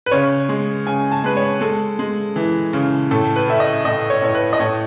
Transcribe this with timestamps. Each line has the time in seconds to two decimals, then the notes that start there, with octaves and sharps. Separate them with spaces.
0.06 B4
0.11 C#3 C#5
0.49 G#3
0.87 C#3 G#5
1.12 A5
1.24 G#3 B4
1.37 C#5
1.61 G#3 A4
1.99 G#3
2.36 E3
2.73 C#3
3.11 A2 A4
3.36 B4
3.48 A2 E5
3.60 D#5
3.85 A2 D#5
4.10 C#5
4.22 A2 C#5
4.35 B4
4.53 D#5
4.59 A2 C#5